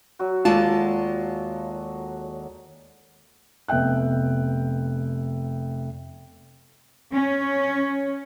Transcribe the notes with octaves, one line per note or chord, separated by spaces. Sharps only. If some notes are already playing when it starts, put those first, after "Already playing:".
F#3 F#4
D#2 G#3 F4 A4 D5 A5
F1 B3 E5 G5 F#6
C#4